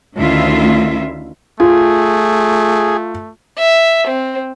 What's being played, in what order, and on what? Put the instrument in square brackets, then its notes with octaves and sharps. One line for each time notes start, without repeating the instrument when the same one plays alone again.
[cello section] D2 D#3 C#4 E4 F4 E5
[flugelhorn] A3 [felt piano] F4 [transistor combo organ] G#4
[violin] E5
C4